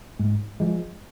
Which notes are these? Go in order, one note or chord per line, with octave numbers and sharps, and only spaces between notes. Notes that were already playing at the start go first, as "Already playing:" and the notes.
G#2
F3 G#3